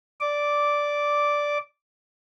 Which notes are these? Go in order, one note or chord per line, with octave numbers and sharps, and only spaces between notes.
D5 D6